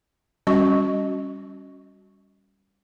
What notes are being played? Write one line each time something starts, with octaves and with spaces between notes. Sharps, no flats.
G3 C#4 F#4 D#5 C#6